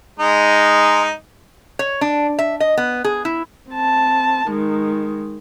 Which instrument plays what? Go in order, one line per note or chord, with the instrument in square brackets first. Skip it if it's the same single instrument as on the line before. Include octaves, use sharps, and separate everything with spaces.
[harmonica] G#3 D#4
[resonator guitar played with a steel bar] C#5
D4
E5
D#5
B3
G#4
E4
[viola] C4 A5
D#3 G#3